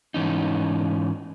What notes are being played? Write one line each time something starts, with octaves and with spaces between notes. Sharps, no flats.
G#2 E3 C#4 D#4